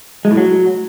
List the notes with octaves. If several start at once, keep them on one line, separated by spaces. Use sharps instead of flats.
G#3
A2
F#3